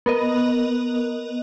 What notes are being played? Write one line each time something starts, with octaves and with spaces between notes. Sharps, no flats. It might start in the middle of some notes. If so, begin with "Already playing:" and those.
B3 A#4 D#5